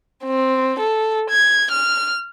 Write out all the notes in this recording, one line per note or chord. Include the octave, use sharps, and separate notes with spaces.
C4
A4
G#6
F6